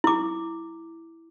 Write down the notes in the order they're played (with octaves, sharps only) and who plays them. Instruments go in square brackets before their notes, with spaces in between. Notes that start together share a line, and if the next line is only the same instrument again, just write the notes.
[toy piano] E4 D6